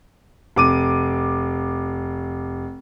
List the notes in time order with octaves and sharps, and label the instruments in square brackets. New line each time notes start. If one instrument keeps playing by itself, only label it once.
[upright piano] F1 D6 D#7